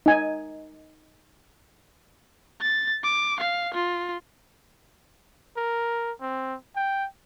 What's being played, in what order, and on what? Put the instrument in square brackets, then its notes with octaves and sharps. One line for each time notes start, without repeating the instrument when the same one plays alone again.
[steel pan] D#4 G#5
[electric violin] A6
D6
F5
F4
[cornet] A#4
C4
G5